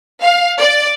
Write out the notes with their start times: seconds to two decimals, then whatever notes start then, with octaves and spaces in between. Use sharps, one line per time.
0.21 F5
0.58 D5